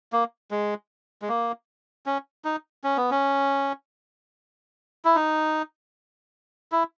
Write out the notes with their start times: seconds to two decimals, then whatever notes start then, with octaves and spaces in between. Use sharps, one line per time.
0.12 A#3
0.51 G#3
1.22 G#3
1.29 A#3
2.06 C#4
2.45 D#4
2.84 C#4
2.97 B3
3.11 C#4
5.05 E4
5.16 D#4
6.72 E4